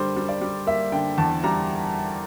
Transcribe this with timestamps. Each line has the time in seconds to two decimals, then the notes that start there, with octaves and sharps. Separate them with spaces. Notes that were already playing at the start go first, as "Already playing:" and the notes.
Already playing: D3 G3 A4 A#4 C5
0.16 G3
0.29 D5
0.41 G3
0.67 A#3 E5
0.92 D3 G5
1.18 E2 A5
1.44 G3 A#5